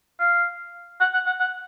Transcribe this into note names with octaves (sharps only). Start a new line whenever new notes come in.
F5
F#5
F#5
F#5
F#5